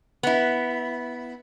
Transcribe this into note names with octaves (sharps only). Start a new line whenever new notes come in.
B3 E4